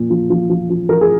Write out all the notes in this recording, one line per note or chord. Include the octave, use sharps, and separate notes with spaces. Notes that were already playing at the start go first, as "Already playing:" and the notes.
Already playing: A#2 F3
F3
F3
F3
F3
F3 A#4
G#4